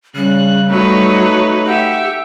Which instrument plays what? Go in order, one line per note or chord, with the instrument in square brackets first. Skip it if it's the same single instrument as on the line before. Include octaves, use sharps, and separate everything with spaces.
[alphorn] C#3 [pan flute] G3 [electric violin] F#6
[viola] F#3 C#5 [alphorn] A3 [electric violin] D#4 B4
[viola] G4 E5 [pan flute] F#5